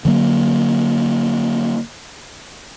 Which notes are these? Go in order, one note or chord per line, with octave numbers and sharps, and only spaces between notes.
D3 F#3 A#3